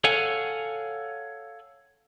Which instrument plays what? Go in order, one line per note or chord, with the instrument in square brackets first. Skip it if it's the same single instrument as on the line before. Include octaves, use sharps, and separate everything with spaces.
[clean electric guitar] A4 C#5 F5 F#5 G#5